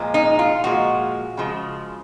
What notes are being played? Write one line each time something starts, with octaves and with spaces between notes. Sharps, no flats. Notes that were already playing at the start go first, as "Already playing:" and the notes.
Already playing: A#2 F3 G#3
D#4
F4
A#2 F3 G#3 F#4
C#3 F3 G#3